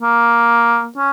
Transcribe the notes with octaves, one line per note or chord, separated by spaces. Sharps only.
A#3
C#4